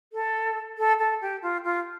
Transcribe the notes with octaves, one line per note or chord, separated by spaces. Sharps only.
A4
A4
A4
G4
F4
F4